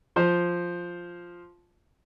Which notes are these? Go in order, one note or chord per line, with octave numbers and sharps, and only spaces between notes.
F3 C5